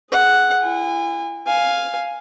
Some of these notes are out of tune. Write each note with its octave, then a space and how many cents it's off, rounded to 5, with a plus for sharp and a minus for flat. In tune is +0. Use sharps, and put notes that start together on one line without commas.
G#4 +10 F#5 +0
E4 +35 G#5 -30
F5 +0 G#5 +0